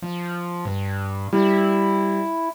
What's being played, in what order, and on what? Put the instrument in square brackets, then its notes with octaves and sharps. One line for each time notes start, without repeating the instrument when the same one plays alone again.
[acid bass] F3
G2
[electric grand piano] G3 [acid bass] E4